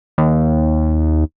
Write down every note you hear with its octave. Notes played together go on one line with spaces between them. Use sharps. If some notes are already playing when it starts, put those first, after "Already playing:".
D#2